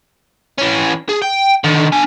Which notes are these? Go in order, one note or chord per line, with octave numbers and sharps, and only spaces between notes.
E3 C#4
G#4
G5
D3 D#3
D4 G#5